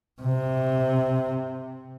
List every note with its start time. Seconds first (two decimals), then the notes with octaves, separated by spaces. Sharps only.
0.22 C3